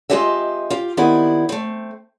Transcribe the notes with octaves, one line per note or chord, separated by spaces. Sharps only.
G#3 C4 F4 G4 D#5 E5
F4 G4
D#3 B3 C4 E4 G4 D5
A3 C4